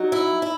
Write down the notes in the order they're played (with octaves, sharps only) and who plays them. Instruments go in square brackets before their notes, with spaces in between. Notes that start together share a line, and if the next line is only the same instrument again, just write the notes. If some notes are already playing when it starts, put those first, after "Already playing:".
Already playing: [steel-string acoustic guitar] F#3 [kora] D#4
[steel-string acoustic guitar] E4
E4